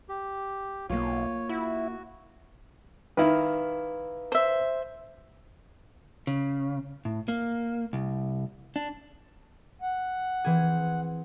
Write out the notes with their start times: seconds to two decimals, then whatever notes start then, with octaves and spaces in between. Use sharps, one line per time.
0.09 G4
0.90 B1 A#3 F4 C#5
1.49 E4 F#4
3.17 D#3 E4 B4 F5
4.32 C5 E5
6.27 C#3
7.05 A2
7.28 A#3
7.93 C2
8.76 D4
9.82 F#5
10.45 E3 C4 G#4